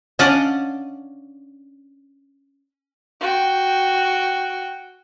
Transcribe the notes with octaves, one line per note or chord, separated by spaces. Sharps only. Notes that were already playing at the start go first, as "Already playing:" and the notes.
C#4 D4 D5 D#5 F5 F#5
F#4 G5